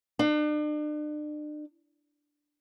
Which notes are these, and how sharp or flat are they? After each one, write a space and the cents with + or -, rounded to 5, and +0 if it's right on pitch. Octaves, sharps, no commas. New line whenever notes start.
D4 +40